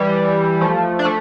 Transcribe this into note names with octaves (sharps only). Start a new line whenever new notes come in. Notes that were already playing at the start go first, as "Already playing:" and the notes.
Already playing: E3 G3
F3 A3
D4
A3